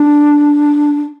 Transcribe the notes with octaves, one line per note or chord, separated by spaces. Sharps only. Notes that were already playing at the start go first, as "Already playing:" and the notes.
Already playing: D4